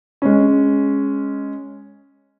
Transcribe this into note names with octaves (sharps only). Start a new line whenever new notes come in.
G#3 C#4